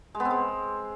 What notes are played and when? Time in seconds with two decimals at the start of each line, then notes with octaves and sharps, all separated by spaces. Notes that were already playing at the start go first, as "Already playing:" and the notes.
0.15 G#3
0.20 B3
0.25 C4
0.31 G#3